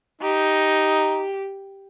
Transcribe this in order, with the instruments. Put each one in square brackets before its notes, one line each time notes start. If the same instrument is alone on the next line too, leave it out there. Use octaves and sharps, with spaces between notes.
[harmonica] D#4 [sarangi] G4